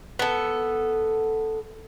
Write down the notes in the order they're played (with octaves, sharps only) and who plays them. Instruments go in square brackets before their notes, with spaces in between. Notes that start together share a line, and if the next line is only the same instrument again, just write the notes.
[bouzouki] B3 A4